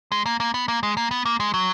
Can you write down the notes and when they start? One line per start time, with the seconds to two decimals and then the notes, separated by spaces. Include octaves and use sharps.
0.12 G#3
0.26 A#3
0.40 A#3
0.54 B3
0.68 A#3
0.83 G#3
0.97 A#3
1.11 B3
1.25 A#3
1.40 G#3
1.54 F#3